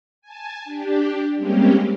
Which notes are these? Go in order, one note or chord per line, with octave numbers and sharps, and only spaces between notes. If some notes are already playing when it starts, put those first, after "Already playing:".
G#5 A5
D4 G4
G3 G#3 A#3 C4 C#4 G4